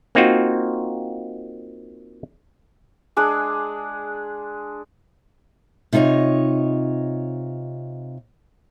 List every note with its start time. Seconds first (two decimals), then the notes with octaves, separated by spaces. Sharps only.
0.15 A#3 C4 D#4 F4 F#4
3.16 G#3 D4 G#4
5.93 C3 D#4 F4 C#5 D#5